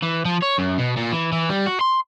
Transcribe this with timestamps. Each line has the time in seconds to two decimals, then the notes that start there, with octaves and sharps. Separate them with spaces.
0.03 E3
0.25 F3
0.42 C#5
0.58 F#2
0.78 B2
0.97 A#2
1.12 E3
1.32 E3
1.49 G3
1.66 F#4
1.80 C6